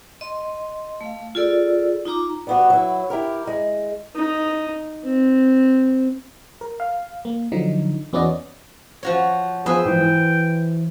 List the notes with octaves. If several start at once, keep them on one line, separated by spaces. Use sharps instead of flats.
D#5 C6
A3 F5
F4 G#4 A4 D5 E6
D#4 F4 A#5 D6
G3 B3 F#4
F#3 E4
E4 G4 A#4
G#3
D#4
C4
A#4
F5
A#3
D3 F3 F#3 D#4
E2 B3 C#4 F#4 D5 D#5
F3 F#4 C#5
F3 B3 F4 G#4 B4 C5 E5
G#2 E3 F3 G5
E3